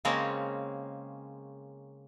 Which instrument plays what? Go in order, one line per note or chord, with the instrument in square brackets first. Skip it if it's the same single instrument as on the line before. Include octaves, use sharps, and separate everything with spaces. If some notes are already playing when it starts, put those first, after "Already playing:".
[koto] C#3 G#3 A#3 C4 C#4 A#4